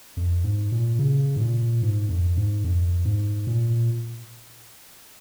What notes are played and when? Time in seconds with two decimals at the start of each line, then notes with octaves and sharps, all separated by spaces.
0.17 F2
0.44 G#2
0.72 A#2
0.99 C#3
1.36 G#2
1.40 A#2
1.82 G#2
2.09 F2
2.37 G#2
2.64 F2
3.05 G#2
3.47 A#2